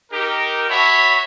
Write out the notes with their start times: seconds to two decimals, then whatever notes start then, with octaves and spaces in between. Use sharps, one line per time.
0.11 D#4 G4 A#4
0.68 F#4 C#5 E5 A5 B5